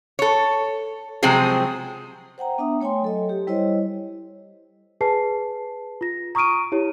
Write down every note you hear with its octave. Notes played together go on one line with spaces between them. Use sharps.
A4 C#5
C3 F3 F#3 G#3 C4 G#4
C5 F#5 G5 A#5
B3 D4 E5 A#5 D#6
A3 C#5 G5 G#5 C6
F#3 A4 D#5
G4
G3 E4 C5 C#5 D#5
G#4 B4 G#5 A5 C7
F4 A#6
A#5 C#6 D#6 F6 D7 D#7
E4 G4 C#5